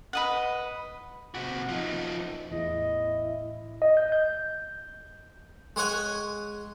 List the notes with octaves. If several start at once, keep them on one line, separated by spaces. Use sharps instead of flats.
B4 D#5 F#5
C3 F#4
F3 D#4
E2 A2 E4 D#5
D#5
G6
G6
G#3 G#4 C#5 F#5 G#5